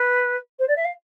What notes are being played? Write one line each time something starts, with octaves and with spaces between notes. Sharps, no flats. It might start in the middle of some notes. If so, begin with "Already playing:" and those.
Already playing: B4
C5
D5
E5
F5